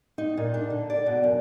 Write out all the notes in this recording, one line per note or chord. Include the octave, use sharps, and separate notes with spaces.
D#4
A#2
D4
D3
D5
B2
F#2